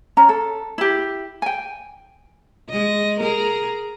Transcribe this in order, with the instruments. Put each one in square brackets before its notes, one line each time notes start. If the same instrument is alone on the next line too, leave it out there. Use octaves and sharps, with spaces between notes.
[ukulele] C#4 A#5
A4
E4 G4
G5 G#5
[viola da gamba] G#3 D#5
G#4 A#4